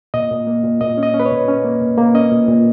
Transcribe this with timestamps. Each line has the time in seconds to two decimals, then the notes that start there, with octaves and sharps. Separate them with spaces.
0.14 A#2 D#5
0.31 A#2
0.47 A#3
0.64 A#2
0.81 A#2 D#5
0.97 C#4
1.03 D#5
1.14 C#4
1.20 B4
1.26 C#5
1.31 A#2
1.48 C#4
1.64 A#3
1.81 A#2
1.98 A#3
2.15 C#4 D#5
2.32 A#2
2.48 A#2